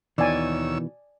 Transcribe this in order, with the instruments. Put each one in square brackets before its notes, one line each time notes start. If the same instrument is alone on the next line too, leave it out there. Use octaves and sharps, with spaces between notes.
[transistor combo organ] D#2 C#5 E6 [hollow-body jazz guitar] B2 D#3 E3 [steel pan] D5 G#5